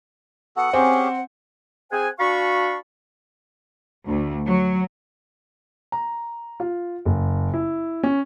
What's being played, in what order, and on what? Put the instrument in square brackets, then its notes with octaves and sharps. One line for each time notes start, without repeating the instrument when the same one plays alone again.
[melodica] B3 F#4 A4 [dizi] F#5
[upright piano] C4 [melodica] C#4 G4 G#4
[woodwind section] C4 G#4 C5 F#5 G#5
D4 F#4 F5 A5 B5 C#6
[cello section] D2
F#3
[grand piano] A#5
F4
F#1
E4
C#4